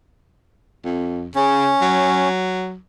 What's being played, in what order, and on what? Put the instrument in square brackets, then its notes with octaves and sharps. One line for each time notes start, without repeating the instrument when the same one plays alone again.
[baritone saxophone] F2
[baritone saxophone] C#3 [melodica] C#4
[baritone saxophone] F#3